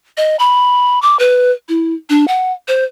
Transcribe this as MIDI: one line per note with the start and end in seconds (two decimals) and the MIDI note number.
0.17 0.36 75
0.39 1.01 83
1.02 1.17 86
1.19 1.52 71
1.69 1.94 64
2.10 2.27 62
2.28 2.52 78
2.68 2.84 72